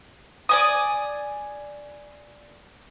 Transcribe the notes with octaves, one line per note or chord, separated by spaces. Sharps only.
D5 G#5 D#6